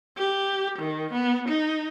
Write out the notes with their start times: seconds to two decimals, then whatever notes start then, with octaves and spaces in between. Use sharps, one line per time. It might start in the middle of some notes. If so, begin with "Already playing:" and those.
0.17 G4
0.79 D#3
1.13 B3
1.48 D#4